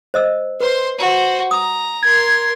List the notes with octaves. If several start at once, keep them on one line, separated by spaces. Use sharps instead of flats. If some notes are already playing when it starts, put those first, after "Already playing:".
C5 D#5 E6
B4 C5 C6
F#4 C5
A#5 D#6
A#4 C6 G#6